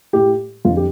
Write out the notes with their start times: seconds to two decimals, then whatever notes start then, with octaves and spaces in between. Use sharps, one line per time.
0.13 A2 G4
0.65 F2 D3 F4
0.77 G4